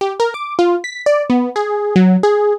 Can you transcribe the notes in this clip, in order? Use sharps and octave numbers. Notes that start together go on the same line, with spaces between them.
G4
A#4
D6
F4
B6
D5
B3
G#4
F#3
G#4